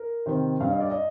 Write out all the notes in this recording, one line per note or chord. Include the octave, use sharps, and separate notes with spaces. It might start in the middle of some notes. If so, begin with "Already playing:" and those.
Already playing: A#4
C3 D#3 C5
G2 F5
D#5
D5
D#5